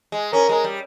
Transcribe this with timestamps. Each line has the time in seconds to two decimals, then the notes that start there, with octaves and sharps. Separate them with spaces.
0.12 G#3
0.33 C#4 A#4
0.49 G#3
0.64 G3